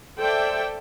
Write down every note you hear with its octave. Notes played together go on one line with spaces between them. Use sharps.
A4 C5 D5 E5 G5